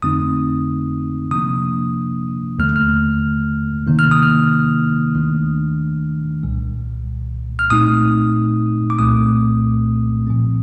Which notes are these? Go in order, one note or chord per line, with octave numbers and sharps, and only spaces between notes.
F2 D3 A3 C4 D#4 D#6
C3 F3 A#3 D4 D#6
D#2 D3 A3 F6
F6
C3 D#3 A#3 D#4
F6
D#6
F6
D#2 D#3 A3 D4
C2 A#2 G3
F6
A#2 A3 C4 D#4 D#6
D6
C2 A#2 A3 C4 D#6
A#2 F3 C4